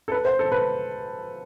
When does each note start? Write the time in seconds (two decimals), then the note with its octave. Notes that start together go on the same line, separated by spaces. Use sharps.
0.08 A4
0.12 B4
0.25 C5
0.39 A4
0.52 B4